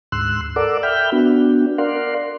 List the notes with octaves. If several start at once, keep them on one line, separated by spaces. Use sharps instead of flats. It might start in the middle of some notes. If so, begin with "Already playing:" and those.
D2 G#2 C6 E6 F#6
A4 A#4 D5 F#5 D6 E6
E5 G5 B5 F6 G6
B3 D4 F#4
A#4 D5 F5 F#5 C6